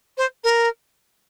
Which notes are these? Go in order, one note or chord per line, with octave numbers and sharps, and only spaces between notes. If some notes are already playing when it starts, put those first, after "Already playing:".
C5
A#4